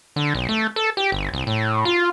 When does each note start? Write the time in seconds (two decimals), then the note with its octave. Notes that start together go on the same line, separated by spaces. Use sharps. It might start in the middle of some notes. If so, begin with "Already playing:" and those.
0.16 D3
0.35 B1
0.49 A3
0.76 A4
0.97 G4
1.12 G1
1.34 C2
1.47 A2
1.85 F4